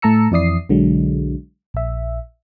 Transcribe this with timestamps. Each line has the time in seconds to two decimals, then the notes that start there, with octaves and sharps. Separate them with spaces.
0.02 A2 A3 A5 A#5 E6 C#7
0.31 F2 E3 E4 D5 D#6 C7
0.69 B1 D3 F#3 G#3
1.74 A#1 E5